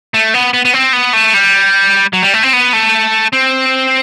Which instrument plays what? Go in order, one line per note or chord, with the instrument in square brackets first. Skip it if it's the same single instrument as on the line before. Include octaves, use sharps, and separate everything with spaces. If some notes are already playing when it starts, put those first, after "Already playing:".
[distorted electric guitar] A3
B3
B3
B3
C4
B3
A3
G3
F#3
G3
A3
C4
B3
A3
C4